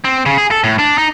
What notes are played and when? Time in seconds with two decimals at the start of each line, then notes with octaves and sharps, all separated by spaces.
0.04 C4
0.26 C#3
0.38 G#4
0.51 A4
0.64 A2
0.79 D4
0.98 D#4